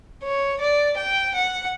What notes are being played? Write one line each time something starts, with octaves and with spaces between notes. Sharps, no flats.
C#5
D5
G5
F#5